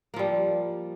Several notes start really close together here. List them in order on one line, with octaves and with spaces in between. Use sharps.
A#3 F3 G3